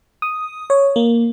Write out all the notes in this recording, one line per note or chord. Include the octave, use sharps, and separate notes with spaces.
D#6
C#5
A#3